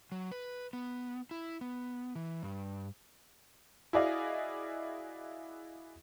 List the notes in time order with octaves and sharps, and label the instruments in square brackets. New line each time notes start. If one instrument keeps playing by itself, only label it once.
[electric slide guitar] F#3
B4
B3
E4
B3
E3
G2
[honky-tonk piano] E4 F#4 G#4 D5 D#5 F5